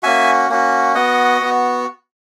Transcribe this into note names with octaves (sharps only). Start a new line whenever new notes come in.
A#3 C#4 F#4 E5 G#5
A#3 C#4 F#4
B3 F#4 D#5 F#5
B3 F#4